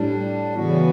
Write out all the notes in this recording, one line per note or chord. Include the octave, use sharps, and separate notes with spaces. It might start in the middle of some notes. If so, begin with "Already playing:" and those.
Already playing: A2 G3 D4
C#3 E3 B3 F#4